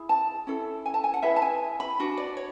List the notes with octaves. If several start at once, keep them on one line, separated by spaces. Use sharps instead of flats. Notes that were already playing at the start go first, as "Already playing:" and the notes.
Already playing: E4 G#4
A5
C#4 E4 A4
G#5
A5
G#5
F#5
E4 G#4 B4 E5
A5
G#5
B5
D4 F#4
D5
C#5